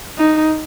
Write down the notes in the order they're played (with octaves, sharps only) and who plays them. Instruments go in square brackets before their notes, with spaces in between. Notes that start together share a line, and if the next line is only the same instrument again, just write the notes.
[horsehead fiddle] D#4